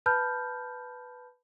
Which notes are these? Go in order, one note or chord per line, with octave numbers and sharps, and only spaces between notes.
B4 A5 B5 F6 G6